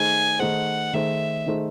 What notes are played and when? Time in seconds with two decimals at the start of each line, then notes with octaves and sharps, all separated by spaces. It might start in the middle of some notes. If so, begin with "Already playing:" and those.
Already playing: D#3 A3 D#4 G#4 C5 G#5
0.39 D#3 A3 D#4 G#4 C5 F#5
0.93 D#3 A3 D#4 G#4 C5 E5
1.46 D#3 A3 D#4 G#4 C5